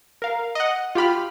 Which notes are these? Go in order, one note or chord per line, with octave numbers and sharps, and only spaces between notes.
A#4 F5
D#5 F#5
F4 G4 B5 F6